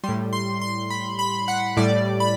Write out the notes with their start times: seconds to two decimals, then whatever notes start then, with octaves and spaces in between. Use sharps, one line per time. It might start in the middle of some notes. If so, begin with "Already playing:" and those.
0.04 G3 C6
0.08 A2
0.33 C6
0.61 C6
0.90 B5
1.19 B5
1.48 F#5
1.77 A2 G3 D5
2.20 B5